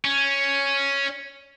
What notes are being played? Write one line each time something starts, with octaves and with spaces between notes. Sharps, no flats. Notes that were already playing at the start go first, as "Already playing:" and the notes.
C#4